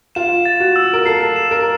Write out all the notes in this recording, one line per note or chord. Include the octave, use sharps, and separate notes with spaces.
F4 E7
A6
F#4
E6
A#4
A4 C7
E7
A#4